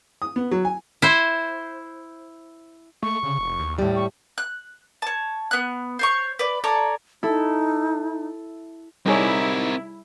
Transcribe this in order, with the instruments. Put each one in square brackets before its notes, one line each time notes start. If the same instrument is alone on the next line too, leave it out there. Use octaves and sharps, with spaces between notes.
[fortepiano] D#6
B3
F#3
G#5
[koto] E4 C5
[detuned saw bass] A3 [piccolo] C#6
[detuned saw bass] C#3
F1
D#2
[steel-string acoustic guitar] A2 G3
[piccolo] C#6
[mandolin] F#6
C#5 A5
B3 F#6
C5 C#5 C#6
B4 D5
A4 C#5 D5 A#5
[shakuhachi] D#4 [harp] E4 A4
[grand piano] C3 D#4 [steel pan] G3 G#4 C#5 [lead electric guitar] C4 A#4 [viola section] E4